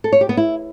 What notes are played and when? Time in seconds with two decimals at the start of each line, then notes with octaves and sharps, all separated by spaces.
0.04 A4
0.12 C#5
0.21 G4
0.29 B3
0.37 E4